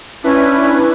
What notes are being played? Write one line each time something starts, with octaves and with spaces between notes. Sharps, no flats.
C#4 D4 E4 B4